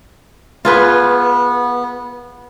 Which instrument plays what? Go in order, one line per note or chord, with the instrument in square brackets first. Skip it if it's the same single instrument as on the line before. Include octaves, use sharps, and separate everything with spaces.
[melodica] B3 [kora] F4 G#4 B4